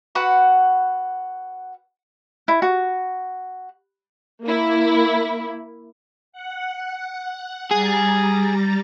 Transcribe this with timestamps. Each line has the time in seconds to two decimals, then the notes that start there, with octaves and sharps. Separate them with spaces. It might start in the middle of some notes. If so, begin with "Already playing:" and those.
0.15 F#4 B4 F#5 B5
2.48 E4
2.62 F#4
4.45 A#3 E4
6.32 F#5
7.71 G3 G#4 A#5 A6